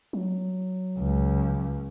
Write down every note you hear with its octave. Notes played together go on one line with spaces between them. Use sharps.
F#3
C#2